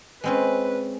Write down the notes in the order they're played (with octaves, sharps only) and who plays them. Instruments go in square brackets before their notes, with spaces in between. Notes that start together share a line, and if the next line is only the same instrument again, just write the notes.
[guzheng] G#3 C4 C#4 [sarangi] B4